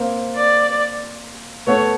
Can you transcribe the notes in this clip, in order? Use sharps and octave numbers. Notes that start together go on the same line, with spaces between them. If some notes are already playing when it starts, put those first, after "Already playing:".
Already playing: A#3 C4
D5
A3 B3 C#5